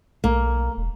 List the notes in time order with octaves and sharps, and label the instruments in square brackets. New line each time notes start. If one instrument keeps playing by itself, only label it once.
[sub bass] B1 [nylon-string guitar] A#3
[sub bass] E1